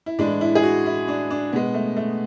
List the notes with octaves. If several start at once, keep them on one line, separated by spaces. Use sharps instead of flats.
E4
A2 E3 G#3 D4
E4
G#4
F#4
E4
D4
D4
B2 G#3 B3
A3
A3